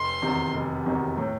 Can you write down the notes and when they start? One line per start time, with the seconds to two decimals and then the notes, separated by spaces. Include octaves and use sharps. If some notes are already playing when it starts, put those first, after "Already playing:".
Already playing: F1 C6
0.22 E2 C3 D#3
0.54 F1
0.86 E2 C3 D#3
1.17 A2